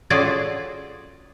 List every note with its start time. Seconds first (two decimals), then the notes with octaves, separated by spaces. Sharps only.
0.10 C#4 F4 F#4 G#4 A4 D5